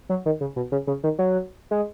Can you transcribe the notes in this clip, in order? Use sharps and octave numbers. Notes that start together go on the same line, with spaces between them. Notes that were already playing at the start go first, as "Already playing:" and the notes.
F#3
D#3
C#3
B2
C#3
C#3
D#3
F#3
G#3